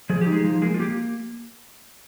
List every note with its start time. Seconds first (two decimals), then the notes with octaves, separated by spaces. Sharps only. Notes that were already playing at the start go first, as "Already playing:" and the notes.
0.10 F3 G#4
0.21 G4
0.27 D#4
0.32 G#3 G#4
0.44 F3
0.62 G#3 A#3 G#4
0.74 F4
0.79 A#3 G4